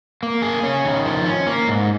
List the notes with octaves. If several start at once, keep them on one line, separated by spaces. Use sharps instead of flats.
A#3
G#4
C#4
D#3
F3
C#4
A#3
G#2